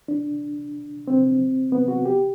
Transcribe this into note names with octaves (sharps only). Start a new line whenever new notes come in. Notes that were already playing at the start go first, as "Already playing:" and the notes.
D4
C4
B3
F#4
G4